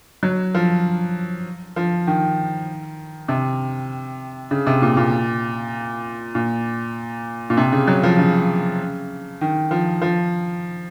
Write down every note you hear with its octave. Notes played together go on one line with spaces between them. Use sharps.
F#3
F3
F3
D#3
C3
C#3
C3
A#2
A#2
A#2
A#2
C3
C#3
F#3
F3
C#3
D#3
F3
F3